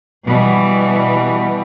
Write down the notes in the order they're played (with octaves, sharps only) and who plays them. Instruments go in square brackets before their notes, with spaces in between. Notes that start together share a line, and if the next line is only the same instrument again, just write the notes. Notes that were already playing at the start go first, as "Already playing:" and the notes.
[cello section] B2 E3 G3